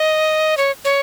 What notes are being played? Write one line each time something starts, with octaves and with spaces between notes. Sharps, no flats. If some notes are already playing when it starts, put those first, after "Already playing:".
Already playing: D#5
C#5
C#5